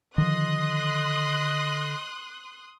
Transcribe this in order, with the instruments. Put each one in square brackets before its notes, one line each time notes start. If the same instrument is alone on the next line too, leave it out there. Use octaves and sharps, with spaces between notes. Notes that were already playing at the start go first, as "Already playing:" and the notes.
[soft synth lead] D3 [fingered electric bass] D#3 F3 [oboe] D#5 [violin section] C6 D#6 F#6